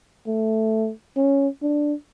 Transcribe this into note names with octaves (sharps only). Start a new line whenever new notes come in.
A3
C#4
D4